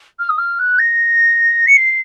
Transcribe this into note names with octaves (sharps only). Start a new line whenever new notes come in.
F6
D#6
F6
F#6
A#6
C#7
C7